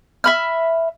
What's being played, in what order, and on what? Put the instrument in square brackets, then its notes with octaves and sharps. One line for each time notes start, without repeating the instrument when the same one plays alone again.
[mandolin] E5 B5 F6